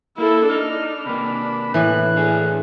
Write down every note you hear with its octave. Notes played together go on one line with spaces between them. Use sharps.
A#3 E4 A4
D4 D#4 F6
C3 A#3 B5
A2 E3 F#6
D4 G#4